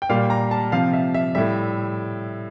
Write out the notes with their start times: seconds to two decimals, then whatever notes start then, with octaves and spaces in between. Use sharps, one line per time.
0.02 G5
0.09 A#2 G3 F5
0.30 A#5
0.51 A5
0.72 C3 F3 F5
0.93 E5
1.14 E5
1.35 A2 G3 E5